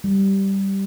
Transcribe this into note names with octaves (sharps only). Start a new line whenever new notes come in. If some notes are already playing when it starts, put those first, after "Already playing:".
G3